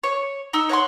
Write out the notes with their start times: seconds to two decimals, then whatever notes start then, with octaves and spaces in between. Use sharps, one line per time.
0.04 C#5
0.53 D#4 E6
0.69 C#5 F#5 A#5 C6